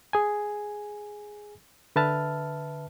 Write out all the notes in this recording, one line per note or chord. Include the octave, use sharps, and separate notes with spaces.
G#4 G#5
D3 B4 E5 A5 F6